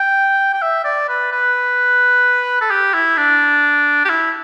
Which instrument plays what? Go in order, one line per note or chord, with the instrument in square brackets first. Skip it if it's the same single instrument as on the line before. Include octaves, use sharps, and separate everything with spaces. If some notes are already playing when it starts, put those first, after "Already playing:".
Already playing: [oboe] G5
G5
E5
D5
B4
B4
A4
G4
E4
D4
G4
E4